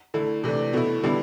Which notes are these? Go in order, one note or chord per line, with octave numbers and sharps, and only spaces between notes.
D3 A3 E4
C3 E3 A3 D4
B2 A3 E4
D3 G3 B3 E4